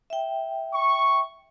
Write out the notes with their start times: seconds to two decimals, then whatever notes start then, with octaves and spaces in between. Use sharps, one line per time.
0.10 E5 G5
0.72 C#6